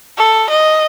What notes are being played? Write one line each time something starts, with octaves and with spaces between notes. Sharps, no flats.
A4
D#5